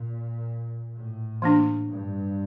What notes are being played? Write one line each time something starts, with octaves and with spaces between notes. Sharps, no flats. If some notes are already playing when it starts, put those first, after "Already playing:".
Already playing: A#2
A2
E3 A#3 D4
G2